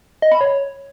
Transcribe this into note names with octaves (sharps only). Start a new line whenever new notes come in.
D#5
B5
C#5